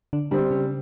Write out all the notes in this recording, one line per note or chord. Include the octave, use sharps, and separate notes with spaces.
D3 D4
D3 G3 C4 D4
C#3 C#4